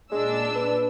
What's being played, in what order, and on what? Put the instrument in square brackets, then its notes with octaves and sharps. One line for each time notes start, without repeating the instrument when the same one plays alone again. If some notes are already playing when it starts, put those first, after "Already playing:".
[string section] A#2 D4 E6 [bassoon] G#3
[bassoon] B4